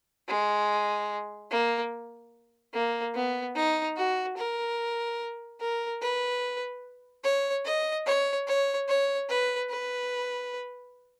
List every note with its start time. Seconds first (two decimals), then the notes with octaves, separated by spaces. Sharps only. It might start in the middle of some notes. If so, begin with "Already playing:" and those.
0.28 G#3
1.51 A#3
2.74 A#3
3.14 B3
3.55 D#4
3.97 F#4
4.37 A#4
5.60 A#4
6.01 B4
7.24 C#5
7.65 D#5
8.06 C#5
8.47 C#5
8.88 C#5
9.29 B4
9.70 B4